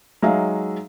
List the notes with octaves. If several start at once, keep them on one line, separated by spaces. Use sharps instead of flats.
F#3 G#3 D#4 E5 F5